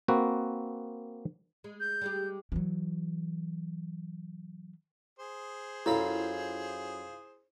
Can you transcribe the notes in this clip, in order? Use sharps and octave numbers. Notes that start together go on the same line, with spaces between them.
A#3 C4 F#4 B4
G#3
G6
G3 G#3 G4
E3 F#3
G#4 C5
F#2 E4 F4 A4 B5